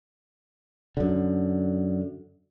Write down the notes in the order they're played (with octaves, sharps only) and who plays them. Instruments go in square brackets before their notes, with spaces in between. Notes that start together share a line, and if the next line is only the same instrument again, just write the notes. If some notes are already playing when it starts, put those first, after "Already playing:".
[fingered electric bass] F#2 D3